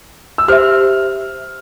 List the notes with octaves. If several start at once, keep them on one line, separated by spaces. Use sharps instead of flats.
E6
G4 C5 E5 F6